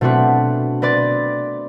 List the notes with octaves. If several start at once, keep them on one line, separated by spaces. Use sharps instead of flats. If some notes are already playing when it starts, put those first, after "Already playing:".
B2 A3 C4 D4 F#4 B4
C4 B4 D5 A6